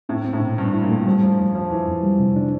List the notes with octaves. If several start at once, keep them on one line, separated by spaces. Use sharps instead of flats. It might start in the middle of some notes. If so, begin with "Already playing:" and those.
A2 C4
C4
A2
A#2
G2 C4
E4
A#2
A3
F3 G3
F2 F3
F2 F3
F2 F3
F2 E3
F2
G3
C3
D4